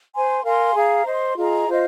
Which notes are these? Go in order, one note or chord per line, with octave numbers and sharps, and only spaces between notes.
C5 G#5 C6
A#4 F5 G#5 C6
G#4 F5 A#5
C5 D#5 C6
F4 G#4 D#5 A#5
F4 C5 D#5